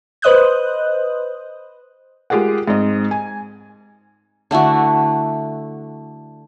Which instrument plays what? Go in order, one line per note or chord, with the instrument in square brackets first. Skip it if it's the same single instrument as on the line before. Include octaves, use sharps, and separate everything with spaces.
[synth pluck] B4 C5 D#5 D#6 F#6 G6
[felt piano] G#3 F4 G4 G#4 A#4 F#5
G#2 C4 D#5
G#5
[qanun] D3 A3 E4 F#4